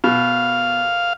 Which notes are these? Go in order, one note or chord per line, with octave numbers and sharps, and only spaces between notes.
B2 F5